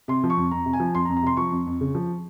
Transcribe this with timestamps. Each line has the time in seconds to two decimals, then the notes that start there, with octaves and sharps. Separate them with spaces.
0.08 C3 C6
0.24 F3
0.30 C#6
0.37 F2
0.51 F2 A#5
0.66 C3
0.73 G#5
0.80 F3
0.95 F2 C6
1.05 A#5
1.09 F2
1.17 A#5
1.23 C3 C6
1.37 F3 C#6
1.51 F2
1.67 F2
1.81 C#3
1.95 F3